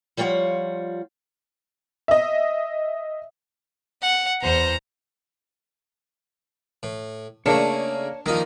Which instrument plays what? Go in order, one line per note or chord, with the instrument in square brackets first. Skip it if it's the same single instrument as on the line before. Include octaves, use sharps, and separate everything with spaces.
[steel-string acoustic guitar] F3 G3 F4 C#5 F#5
[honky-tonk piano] D#5 E5
[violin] F#5
[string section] E2 C5 F#5 [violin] A#5
[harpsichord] A2
[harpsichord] C#3 A3 [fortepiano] A#3 A#4 [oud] D4 [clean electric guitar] C#5
[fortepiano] D#3 F3 [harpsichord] A#3 D#4